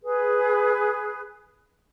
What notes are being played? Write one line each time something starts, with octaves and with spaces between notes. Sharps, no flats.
G#4 B4